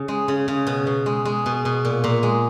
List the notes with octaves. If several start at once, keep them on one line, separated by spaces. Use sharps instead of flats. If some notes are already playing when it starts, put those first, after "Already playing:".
Already playing: C#3 C#5
G#3
C#3
C#3
B2
B2
G#3
G#3
B2
B2
A#2
A#2
G#3